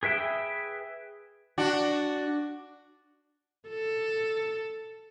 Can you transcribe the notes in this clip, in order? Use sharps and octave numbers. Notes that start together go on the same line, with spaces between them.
G#4 B4 E5 G5
D4 F#4
A4